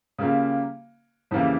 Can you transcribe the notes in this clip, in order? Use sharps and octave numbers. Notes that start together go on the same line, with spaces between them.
C#3 G3 A#3 F4
F2 C#3 E3 G3 A#3